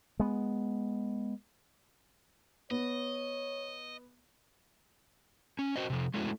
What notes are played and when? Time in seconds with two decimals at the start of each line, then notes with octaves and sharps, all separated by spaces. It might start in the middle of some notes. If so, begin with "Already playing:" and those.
0.20 G#3 B3
2.71 B3 C#5 D#5
5.59 C#4
5.76 F#4 C5 D#5
5.90 C3 F3
6.14 G#3 A3 C#4 E4 F#4